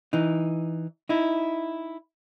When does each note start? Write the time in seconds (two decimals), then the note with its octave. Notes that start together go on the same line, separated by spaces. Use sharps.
0.13 E3 D#4
1.09 D#4 E4